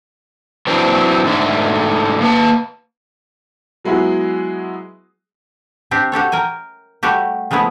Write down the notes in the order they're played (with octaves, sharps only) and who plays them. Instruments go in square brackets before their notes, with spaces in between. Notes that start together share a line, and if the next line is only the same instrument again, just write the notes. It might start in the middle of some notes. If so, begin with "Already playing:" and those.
[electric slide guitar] E3 F#3 C4 D4
G#2 D3 A3
A#3 B4 A5
[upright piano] F#3 G#3 B3 E4 F#4 G#4
[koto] C4 D4 G4 E5
F#4 G4 A4 C#5
A#4 G5 G#5
G3 A3 F#4 G4
F3 G#3 A3 B3 E4